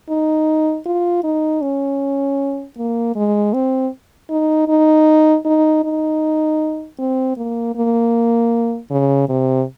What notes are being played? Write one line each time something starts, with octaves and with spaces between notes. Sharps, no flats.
D#4
F4
D#4
C#4
A#3
G#3
C4
D#4
D#4
D#4
D#4
C4
A#3
A#3
C#3
C3